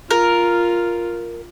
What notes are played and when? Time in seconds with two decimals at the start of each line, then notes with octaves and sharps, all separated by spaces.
0.11 F4 A#4